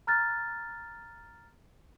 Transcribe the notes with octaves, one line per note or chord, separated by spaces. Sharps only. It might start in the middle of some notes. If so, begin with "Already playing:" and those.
A#5 F6 F#6 A6